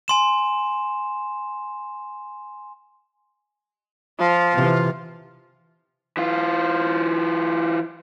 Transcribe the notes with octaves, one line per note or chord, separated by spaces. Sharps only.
G#5 C6 E7
F3 F4
C3 E3
E3 F4